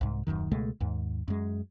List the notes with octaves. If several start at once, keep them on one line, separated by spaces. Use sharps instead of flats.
C2 G#2
D#1 C2 F#2 D#3
C#2 B2 G#3 A3
D#2 G#2
F#2 G#3